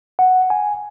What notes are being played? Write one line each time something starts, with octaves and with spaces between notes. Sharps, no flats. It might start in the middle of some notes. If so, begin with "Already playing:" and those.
F#5
G#5